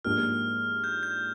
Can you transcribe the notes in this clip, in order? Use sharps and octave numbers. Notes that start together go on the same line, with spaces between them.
G#2 F3 A#3 D4 G4 F6
G6
G6